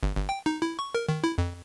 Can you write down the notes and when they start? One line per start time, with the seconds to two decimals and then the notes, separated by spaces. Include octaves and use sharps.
0.03 G1
0.16 G1
0.29 G5
0.46 D#4
0.62 E4
0.79 C#6
0.95 A#4
1.09 D#3
1.24 E4
1.38 F2